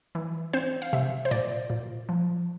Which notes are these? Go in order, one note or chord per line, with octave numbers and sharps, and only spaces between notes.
E3
C4 C5
F5
C3 E5
C5
A#2 D5
A#2
F3